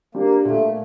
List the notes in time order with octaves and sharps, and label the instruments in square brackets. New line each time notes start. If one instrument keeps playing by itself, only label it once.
[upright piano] G3 D4 [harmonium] A#3
[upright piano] A#2 [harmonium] A3
[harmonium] A3